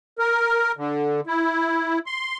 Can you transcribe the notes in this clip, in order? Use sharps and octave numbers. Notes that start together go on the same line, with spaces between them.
A#4
D3
E4
C6